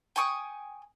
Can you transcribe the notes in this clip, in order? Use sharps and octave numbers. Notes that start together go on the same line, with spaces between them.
G5 G#5 C#6 D#6